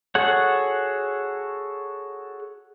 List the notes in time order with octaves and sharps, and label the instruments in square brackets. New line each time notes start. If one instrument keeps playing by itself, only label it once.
[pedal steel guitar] F#4 G#4 A4 C#5 F#5